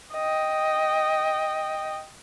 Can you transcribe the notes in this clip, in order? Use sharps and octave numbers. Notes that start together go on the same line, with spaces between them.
D#5 G5